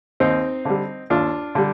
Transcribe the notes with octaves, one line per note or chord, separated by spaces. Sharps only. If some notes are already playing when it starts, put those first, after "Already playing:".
D#2 C4 D#4
D3 G3
D#2 D4 F4
D3 G3